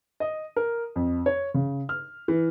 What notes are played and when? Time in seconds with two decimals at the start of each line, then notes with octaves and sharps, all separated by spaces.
0.20 D#5
0.56 A#4
0.96 F2
1.26 C#5
1.54 C#3
1.89 F6
2.28 E3